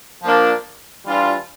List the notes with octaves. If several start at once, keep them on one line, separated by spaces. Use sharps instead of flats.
F3 A#3 D4
E3 G3 D4 F4